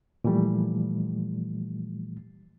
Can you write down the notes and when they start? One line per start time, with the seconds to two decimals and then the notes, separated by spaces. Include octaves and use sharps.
0.24 A#2 E3 F3 G3 A3